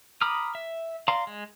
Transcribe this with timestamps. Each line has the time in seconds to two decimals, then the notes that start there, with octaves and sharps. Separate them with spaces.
0.21 A#5 B5 D6 D#6 F6
0.55 E5
1.08 D5 F5 A#5 C6
1.27 G#3